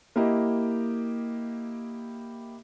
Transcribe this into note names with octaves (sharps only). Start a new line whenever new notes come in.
A#3 E4 G4 D#5